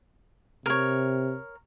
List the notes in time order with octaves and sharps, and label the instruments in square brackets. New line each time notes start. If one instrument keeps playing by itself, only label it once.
[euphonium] C3 [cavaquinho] A#4 C#5